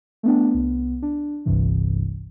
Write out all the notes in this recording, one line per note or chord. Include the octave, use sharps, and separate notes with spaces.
A3 B3 D4
C2 B3
D4
G1 C2 G2 C3 E3